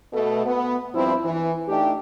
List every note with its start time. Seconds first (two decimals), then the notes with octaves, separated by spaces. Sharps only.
0.13 B2 A3
0.46 B3
0.94 G2 F3 C4 E4
1.24 E3
1.68 A3 D4 D#4 G4